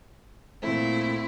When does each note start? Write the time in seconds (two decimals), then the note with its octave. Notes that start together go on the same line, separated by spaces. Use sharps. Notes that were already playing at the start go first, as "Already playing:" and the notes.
0.62 A#2 A3 C4 E4